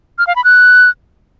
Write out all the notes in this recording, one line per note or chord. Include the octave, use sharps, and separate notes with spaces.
F6
F5
B5
F#6